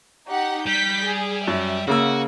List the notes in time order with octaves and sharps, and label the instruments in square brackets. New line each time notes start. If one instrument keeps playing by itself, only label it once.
[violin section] D#4 G4 F#5
[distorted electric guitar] G3 [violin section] G6 B6
[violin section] G#4
[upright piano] F#2 [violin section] E5
[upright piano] C#3 A#3 E6 [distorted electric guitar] F#4